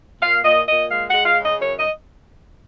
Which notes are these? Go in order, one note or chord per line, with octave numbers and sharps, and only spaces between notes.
A#2 F5
A#2 D#5
A#2 D#5
G#3 F5
G#3 F#5
F5
C#3
D#5
F#2 C#5
D#5